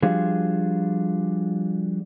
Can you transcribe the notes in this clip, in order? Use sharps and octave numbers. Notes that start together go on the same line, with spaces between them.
F3 G3 D4 F4 F#4 G#4